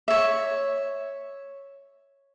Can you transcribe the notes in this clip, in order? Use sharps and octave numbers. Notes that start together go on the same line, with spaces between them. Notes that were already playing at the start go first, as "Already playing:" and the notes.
C#5 E5